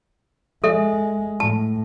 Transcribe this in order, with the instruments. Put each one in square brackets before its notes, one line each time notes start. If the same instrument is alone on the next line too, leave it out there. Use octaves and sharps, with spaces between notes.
[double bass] G#3 [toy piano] A4 E5
[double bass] A2 [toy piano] A5